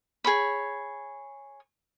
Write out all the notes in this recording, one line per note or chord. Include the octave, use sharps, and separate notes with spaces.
G#4 C#5 B5